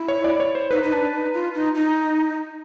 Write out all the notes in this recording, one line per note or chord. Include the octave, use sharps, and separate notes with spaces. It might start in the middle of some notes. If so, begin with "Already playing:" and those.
Already playing: E4
C#5
D5
C#5
C5
D#4 B4
D#4
D4
D#4
F4
D#4
D#4